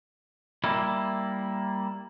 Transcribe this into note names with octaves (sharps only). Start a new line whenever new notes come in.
G3 A#3 E4